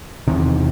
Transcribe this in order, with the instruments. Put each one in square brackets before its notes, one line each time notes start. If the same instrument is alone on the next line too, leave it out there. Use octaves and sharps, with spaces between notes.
[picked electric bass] E2 C3 D#3